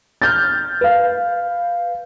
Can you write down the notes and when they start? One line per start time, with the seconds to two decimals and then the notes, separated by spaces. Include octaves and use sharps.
0.22 F6 G6 A6
0.81 B4 F5